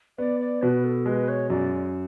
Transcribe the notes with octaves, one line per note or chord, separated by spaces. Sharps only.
B3 D5
D5
B2 B4
A4
G#3 B4
C#5
F#2 D5